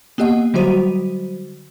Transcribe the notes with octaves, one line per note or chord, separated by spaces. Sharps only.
A#3 B3 G4 D#5 F#5
D3 F#3 G3 F#4 C5 D#7